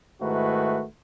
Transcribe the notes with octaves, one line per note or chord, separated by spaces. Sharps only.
G#2 D#3 A3 E4 F#4 B4